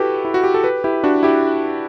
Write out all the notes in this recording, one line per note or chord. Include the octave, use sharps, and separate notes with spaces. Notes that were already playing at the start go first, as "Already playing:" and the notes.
Already playing: E4 F#4 G4 A4 B4
E4
F#4
G4
A4
G4 B4
E4 G4
D4 F#4
E4 G4